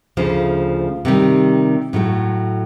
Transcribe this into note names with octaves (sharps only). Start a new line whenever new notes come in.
D2 C#3 F3 A3
C3 D#3 G3
A2 F#3 A3